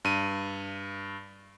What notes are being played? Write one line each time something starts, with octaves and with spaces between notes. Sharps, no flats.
G2 D#7